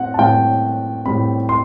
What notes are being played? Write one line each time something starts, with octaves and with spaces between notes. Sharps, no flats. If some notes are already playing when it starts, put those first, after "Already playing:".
Already playing: A2 C4 F#5
A5
A2 G3 C4 G5
A2 G3 C4 B5
C6